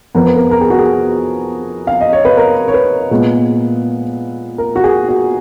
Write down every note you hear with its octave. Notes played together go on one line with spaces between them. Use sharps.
F2 F3 B3 A#4
B4
A#4
A#4
G#4
F#4
G#4
F5
D#5
C#5
B4
A#4
C#5
B4
A#2 G#3 B3
A#4
F#4
G#4
F#4